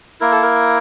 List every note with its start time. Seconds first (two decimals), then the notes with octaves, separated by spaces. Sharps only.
0.21 A#3 E4 A#4
0.32 A4
0.43 A#4